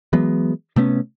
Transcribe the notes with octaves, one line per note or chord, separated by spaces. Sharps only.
E3 F#3 G#3 B3
C3 A3 B3 C#4